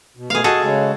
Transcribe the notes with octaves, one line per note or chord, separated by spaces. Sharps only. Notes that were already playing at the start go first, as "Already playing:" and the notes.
B2
B2 A3 B3 G#4 F5
F#4 G#4 A4 D#5
C#3 G#3